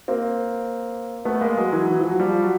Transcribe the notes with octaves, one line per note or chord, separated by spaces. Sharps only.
A#3 C4
A3 B3
G#3 A#3
F#3 G#3
E3 F#3
E3
F3
F#3
F3 G3
F#3